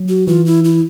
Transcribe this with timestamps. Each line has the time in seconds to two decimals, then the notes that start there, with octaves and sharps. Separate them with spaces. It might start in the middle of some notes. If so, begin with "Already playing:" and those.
Already playing: F#3
0.09 F#4
0.27 E3 F4
0.46 E4
0.64 E4